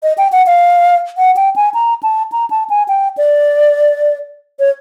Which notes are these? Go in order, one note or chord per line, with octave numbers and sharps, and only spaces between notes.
D#5
G5
F#5
F5
F#5
G5
G#5
A#5
A5
A#5
A5
G#5
G5
D5
C#5